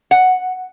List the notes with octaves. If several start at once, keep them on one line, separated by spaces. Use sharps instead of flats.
F#5